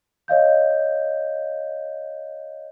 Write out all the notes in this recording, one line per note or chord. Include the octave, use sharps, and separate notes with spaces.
C#5 D#5 F5 G6